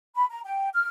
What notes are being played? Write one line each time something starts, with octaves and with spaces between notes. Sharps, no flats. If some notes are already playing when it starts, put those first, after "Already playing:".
B5
A#5
G5
F6